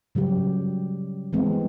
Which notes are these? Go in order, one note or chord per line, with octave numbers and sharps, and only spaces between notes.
C#3 F#3 G3 G4
E3 G3 G#3 B3 C4